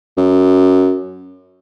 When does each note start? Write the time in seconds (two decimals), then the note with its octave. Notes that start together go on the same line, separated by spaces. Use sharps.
0.17 F#2